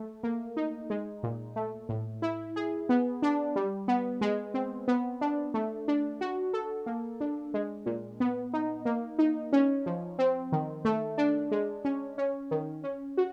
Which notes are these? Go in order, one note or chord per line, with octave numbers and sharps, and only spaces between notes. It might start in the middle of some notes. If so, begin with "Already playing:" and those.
Already playing: A3
A#3
D#4
G#3
A#2
A3
A2
E4
G#4
B3
D4
G3
B3
G#3
C4
B3
D4
A3
D4
F#4
A4
A#3
D4
G#3
A#2
B3
D#4
A#3
D#4
C#4
F3
C4
D#3
A3
D4
G#3
C#4
C#4
D#3
C#4
F#4